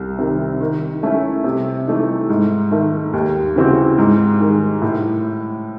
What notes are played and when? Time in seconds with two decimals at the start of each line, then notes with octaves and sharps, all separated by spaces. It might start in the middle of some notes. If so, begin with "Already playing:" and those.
Already playing: C2
0.19 C3 D#3
0.60 D#3
1.03 A3 C#4 E4
1.44 C3
1.88 E3 A3 D#4
2.29 G#2
2.71 D#3 A3
3.13 D#2
3.56 C#3 E3 C4 F#4
3.98 G#2
4.40 D#3 G#3
4.82 A2